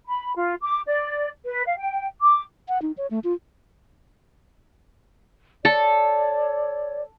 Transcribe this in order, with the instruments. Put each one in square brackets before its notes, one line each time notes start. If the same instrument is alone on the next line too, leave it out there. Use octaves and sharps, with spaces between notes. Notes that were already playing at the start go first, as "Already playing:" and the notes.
[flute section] B5
F4
D6
D5
B4
F5
G5
D6
[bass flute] F#5
D#4
C#5
A3
F4
[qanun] A4 [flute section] C#5 D5